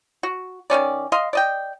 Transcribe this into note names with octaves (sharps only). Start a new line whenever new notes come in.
F#4
D#3 G#3 C#4 D5
D#5 F5 C6
D5 D#5 G5